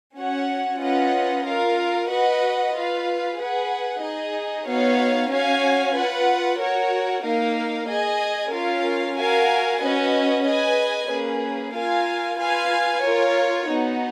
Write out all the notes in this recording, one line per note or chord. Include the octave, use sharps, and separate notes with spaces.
C#4 F#4 C#5 F#5
C#4 F4 B4 D#5 F#5
F4 A#4 F5
F#4 B4 D#5 F#5
F4 B4 F5
G#4 B4 F#5
D#4 G#4 D#5
B3 D#4 F#4 C#5 F5
C#4 F#4 C#5 F5 G#5
F4 B4 F#5
F#4 A#4 C#5
A#3 D#4 A#4 F5
G#4 D#5 G#5
C#4 F4 A#4 F5
F#4 A#4 F5 G#5
C#4 F#4 B4 D#5
G#4 B4 D#5 G#5
A#3 C#4 G#4 B4
F4 A#4 F5 G#5
F4 B4 F5 G#5
F4 A#4 C#5
B3 D#4 F#4